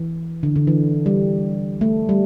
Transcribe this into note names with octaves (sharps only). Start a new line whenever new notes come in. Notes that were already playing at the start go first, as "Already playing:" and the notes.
Already playing: E3
D3
D3
E3
G3
A3
G3